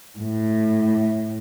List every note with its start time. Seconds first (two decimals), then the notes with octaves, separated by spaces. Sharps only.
0.18 A2